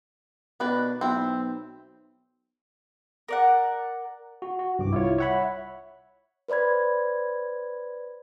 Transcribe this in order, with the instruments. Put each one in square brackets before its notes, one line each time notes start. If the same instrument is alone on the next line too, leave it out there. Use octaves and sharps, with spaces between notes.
[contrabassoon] B2 [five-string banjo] D#3 D4 B4
[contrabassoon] B1 [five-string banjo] C4 E4
[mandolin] A#4 D5 F#5
[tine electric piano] F#4
F#4
[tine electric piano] C2 [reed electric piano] G2 D6
[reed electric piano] E4 F4 C#5
[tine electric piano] C#5 F#5 B5 [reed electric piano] E5
[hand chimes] B4 C5 D5 B5 G#6